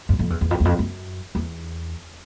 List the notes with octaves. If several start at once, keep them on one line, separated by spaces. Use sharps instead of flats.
F#2
F2
E2
E2
F2
E2
F2
F#2
E2